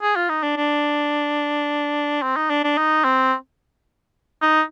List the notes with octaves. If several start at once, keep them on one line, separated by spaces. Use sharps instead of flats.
G#4
F4
D#4
D4
D4
C4
D#4
D4
D4
D#4
C4
D#4